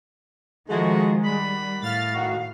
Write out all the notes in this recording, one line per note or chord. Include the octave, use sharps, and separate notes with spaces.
D#3 F3 G#3 A3 F#4
D#3 G3 F#5 B5
A2 F5 F6 A6
D#3 F#4